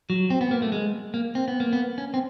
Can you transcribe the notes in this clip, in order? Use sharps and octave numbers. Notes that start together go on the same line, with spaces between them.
F#3
C4
B3
A#3
A3
G#3
A#3
C4
B3
A#3
B3
C#4
C4